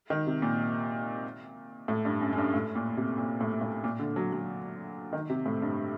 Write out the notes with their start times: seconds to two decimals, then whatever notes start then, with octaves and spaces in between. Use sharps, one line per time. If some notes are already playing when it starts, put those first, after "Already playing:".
0.10 D#3
0.27 C3
0.42 A#2
1.88 A2
2.05 G2
2.21 F#2
2.33 F#2
2.38 G2
2.54 A2
2.75 A#2
2.97 C3
3.18 A#2
3.41 A2
3.61 A2
3.84 A#2
3.99 D3
4.16 F#3
4.33 F#3
5.13 D#3
5.30 C3
5.46 A2
5.62 G2